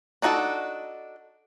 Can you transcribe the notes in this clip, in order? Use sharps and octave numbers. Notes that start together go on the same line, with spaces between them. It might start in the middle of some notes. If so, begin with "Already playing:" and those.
D4 D#4 F#4 G#4 A4